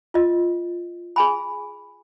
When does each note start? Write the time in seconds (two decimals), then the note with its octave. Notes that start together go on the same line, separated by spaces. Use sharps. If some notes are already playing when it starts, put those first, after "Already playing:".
0.14 F4 D#5
1.16 G#4 G#5 B5